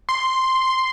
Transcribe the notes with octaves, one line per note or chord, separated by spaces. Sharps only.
C6